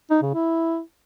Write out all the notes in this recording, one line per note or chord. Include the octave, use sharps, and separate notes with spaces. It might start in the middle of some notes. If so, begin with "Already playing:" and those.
D#4
C#3
E4